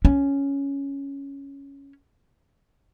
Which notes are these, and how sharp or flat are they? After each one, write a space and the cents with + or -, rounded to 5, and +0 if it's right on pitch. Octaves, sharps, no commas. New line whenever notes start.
C#4 +5